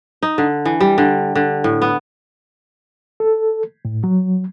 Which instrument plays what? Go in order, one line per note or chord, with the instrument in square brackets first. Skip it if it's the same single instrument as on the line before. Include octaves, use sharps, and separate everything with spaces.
[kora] D#4
D3
E3
G3
D3
D3
A2
B3
[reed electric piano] A4
A2
F#3